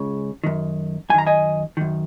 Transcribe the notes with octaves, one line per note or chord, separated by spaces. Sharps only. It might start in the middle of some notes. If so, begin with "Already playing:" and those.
Already playing: C#2 C#3
F#2 D#3
F#2 D#3 G#5 A#5
D#5 G#5
F#2 D#3